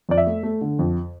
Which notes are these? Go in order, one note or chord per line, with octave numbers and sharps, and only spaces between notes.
F2 D5
E5
A3
A3
D3
F2